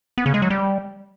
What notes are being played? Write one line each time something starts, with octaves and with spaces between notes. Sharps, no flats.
B3
C#3
G#3
F#3
G3